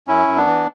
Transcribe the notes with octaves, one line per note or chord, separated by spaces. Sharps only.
F#2 C#4 E4
F#2
B3 D4
E3